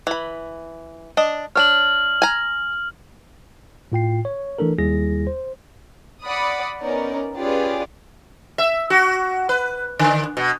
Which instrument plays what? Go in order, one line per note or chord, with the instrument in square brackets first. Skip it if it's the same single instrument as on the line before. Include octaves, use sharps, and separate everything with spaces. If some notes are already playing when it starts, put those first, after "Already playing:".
[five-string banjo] E3 B5
D4 D#5
[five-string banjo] D4 C#5 [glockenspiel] F6 F#7
[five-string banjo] G#5 A#5
[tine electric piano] A2 F4 G5 C7
C#5
E3 A3 D4 A4 A#4
D#2 G3 E4 G#4 A#6
C5
[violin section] D5 F#5 B5 D#6
B3 C#4 D#4 A#4 D5
C#4 F4 G4 G#4 B4 D5
[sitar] E5
F#4
B4
D3
B2